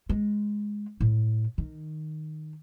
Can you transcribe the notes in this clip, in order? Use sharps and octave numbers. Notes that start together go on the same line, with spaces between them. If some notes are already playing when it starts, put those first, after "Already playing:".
G#3
A2
D#3